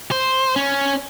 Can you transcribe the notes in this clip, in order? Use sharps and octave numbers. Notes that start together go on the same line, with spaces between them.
C5
C#4